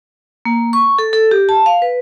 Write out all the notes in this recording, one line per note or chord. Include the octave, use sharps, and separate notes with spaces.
A#3
C#6
A4
A4
G4
A5
F5
B4